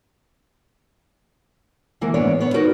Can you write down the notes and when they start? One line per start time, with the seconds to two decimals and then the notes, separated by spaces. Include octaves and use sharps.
2.01 D2 E3 A#3 A#4
2.14 G#2 E3 B3 D4 C#5 D5
2.41 B3 C#5
2.54 D#4 F#4 A#4 B4